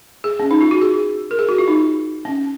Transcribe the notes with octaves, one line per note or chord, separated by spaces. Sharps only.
G#4
C#4
D#4
F4
F#4
G#4
A#4
G#4
F#4
F4
D#4
C#4